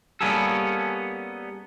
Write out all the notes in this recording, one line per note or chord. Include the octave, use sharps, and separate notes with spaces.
G3 A#3 B3 C#4 G#4 A4